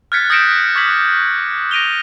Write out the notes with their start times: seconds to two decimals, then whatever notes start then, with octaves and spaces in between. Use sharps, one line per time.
0.12 F6 F#6 G#6 A6 B6 C#7
0.30 D#6 G6 A#6 C#7 D7 E7
0.75 C#6 D6 F#6 G#6 B6 F#7
1.71 A#6 D7 D#7 F7 G7